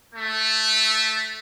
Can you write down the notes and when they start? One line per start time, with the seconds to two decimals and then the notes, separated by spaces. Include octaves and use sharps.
0.15 A3